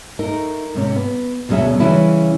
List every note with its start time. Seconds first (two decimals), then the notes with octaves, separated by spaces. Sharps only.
0.19 A3 D#4 A#4
0.74 G#2 C3 C#4
0.96 B3
1.49 D2 B2 F#3 C#4 G#4 E5
1.80 C#3 E3 G3 C#4 E4